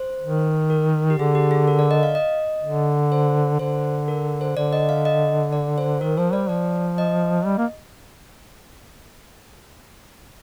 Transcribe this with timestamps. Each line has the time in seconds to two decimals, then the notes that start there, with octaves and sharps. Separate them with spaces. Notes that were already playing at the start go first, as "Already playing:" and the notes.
Already playing: C5
0.22 D#3
0.70 A#4
1.10 G4
1.18 D3 G#4
1.35 G4
1.51 G#4
1.68 A#4
1.79 D5
1.91 D#5
2.03 F5
2.15 D#5
2.63 D3
3.12 C5
3.59 D3 C5
4.08 A#4
4.41 C5
4.57 D3 D5
4.73 D#5
4.89 F5
5.05 D#5
5.53 D5
5.78 C5
6.01 D#3 A#4
6.18 F3 C5
6.33 G3 D5
6.49 F3 D5
6.98 D#5
7.45 G3
7.58 A#3